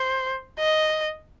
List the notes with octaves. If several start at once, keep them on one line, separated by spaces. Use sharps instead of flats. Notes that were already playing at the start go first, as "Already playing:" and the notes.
Already playing: C5
D#5